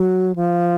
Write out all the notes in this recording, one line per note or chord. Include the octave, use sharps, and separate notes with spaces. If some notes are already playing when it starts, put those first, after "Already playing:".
Already playing: F#3
F3